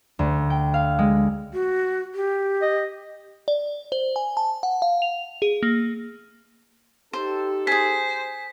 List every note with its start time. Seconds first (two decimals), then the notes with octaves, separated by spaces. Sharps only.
0.19 D2
0.50 G5
0.74 F5
0.99 G#3
1.53 F#4
2.14 G4
2.62 D#5
3.48 D5
3.92 C5
4.16 G#5
4.37 A5
4.63 F#5
4.82 F5
5.02 F7
5.42 G#4
5.63 A#3
7.13 D#4 G4 A4 C5
7.67 G#4 C5 G#5 B6